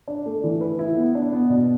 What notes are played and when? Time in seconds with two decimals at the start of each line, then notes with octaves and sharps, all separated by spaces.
0.08 D4
0.26 A3
0.44 E3
0.61 B4
0.79 E4
0.97 B3
1.15 D4
1.33 B3
1.50 B2